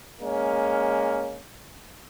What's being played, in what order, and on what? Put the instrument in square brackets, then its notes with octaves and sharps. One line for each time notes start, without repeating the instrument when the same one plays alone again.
[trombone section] G#3 A#3 C#4